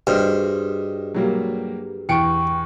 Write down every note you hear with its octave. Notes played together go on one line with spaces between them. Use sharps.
G2 F#4 G#4 C5 D#5 F6
F#3 G3 A#3
E2 G5 C#6 C#7 D7